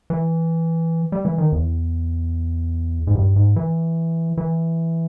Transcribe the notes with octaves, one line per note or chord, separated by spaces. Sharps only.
E3
G3
E3
D#3
E2
G#2
G2
G#2
E3
E3